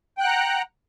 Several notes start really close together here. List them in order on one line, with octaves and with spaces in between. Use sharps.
G5 F#6 F#5 A#5